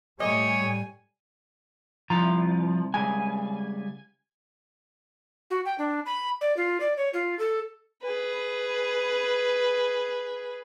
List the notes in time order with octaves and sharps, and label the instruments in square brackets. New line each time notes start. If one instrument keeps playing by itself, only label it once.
[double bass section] A2 G3 [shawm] C#5 [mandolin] D#5 [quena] G#5
[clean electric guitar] C2 E4 A#5 [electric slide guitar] F3
[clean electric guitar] C#3 G3 G#3 [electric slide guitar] G#5
[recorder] F#4
G5
D4
B5
D5
F4
D5
C#5
F4
A4
[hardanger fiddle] G#4 B4